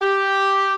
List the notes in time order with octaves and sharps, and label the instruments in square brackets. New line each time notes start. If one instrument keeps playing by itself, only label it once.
[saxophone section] G4